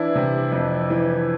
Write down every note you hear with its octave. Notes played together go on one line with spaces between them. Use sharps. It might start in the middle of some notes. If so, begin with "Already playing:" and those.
Already playing: E3 D4 E4
C3
F2
E3